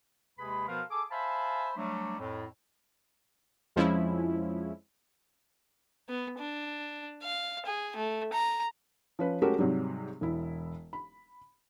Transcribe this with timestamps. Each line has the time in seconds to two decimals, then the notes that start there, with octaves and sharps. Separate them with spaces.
0.38 D#2 C3 G#3 G#4 B4 B5
0.68 B2 F3 B3 A#4 B4 F5
0.91 G#4 A4 D6
1.11 C5 E5 F5 G#5 A5 B5
1.77 F#3 G3 A3 D4
2.19 F2 A2
3.76 F2 F3 G#3 C#4 E4
6.09 B3
6.39 D4
7.23 F5
7.66 G#4
7.96 A3
8.33 A#5
9.19 F3 C#4 B4
9.42 G#3 A3 C#4 F#4 G4 A#4
9.59 G#2 C3 F#3 G3
10.21 E1 E4
10.93 B5